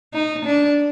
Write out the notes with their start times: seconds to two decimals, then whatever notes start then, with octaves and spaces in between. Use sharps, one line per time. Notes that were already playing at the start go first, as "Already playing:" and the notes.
0.14 D#4
0.45 D4